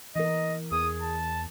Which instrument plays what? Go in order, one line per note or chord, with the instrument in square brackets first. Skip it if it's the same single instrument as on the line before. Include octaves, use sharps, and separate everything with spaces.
[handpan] E3 B3 A#4 [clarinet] D#5
[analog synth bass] E2 [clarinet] G#4 [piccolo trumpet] D#6
[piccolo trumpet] A5